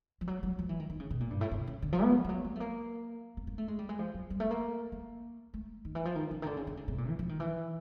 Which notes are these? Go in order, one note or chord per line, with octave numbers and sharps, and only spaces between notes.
F3
F#3
F#3
F3
E3
D#3
D#3
C#3
B2
A#2
G2
A2
C3
C#3
D3
F3
B3
F3
F#3
A#3
A3
A#3
A#3
A#3
A3
G#3
G3
G#3
F3
F#3
G3
A3
A#3
A#3
A3
D#3
E3
F3
D#3
C#3
D#3
D3
C#3
D3
C#3
C3
A#2
E3
F3
D#3
E3